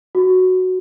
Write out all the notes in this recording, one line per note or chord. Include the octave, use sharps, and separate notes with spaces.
F#4